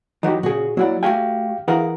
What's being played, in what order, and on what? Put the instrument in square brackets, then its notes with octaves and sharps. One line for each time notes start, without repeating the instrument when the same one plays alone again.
[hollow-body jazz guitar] E3 F#3 [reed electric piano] D#4 F#4 G4
[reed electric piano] A#2 G#4 [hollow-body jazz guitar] C#3 F#4
[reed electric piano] F#3 F#5 [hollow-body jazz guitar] A#3 E4 D5
[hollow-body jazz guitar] A3 F#4 G#5 [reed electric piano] G4 F5 G5
[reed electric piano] E3 A#4 [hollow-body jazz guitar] G#4 F5 F#5